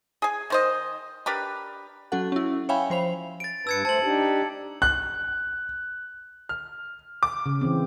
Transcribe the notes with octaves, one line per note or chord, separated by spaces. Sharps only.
G#4 G#5
D#3 C5 D#5
D4 G4 A#4 B4
F#3 C#4 F#4 A4 F#5
C#4 E4
C#5 E5 F5 G5 G#5 B5
F3 C5 B5 F7
A6 D7
G2 B4 A5 E6 G#6 C#7
A3 C5 A5 F#7
D4 D#4 G4
F#6
F6
D6
C#3
E3 C4